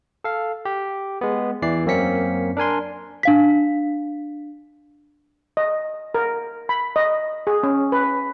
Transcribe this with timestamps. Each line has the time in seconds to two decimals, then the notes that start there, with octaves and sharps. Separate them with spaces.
0.24 A4 F5
0.65 G4
1.21 G#3 B3
1.62 E2 E3 D5 C7
1.86 F#2 A#3 C4 C#4 B6 C#7
2.57 D4 A#4 G#5 C6
3.23 D4 F5 B6
5.57 D#5
6.15 A#4
6.69 B5
6.96 D#5
7.47 G#4
7.63 C#4
7.92 B4